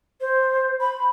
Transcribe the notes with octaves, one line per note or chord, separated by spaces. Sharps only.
C5
B5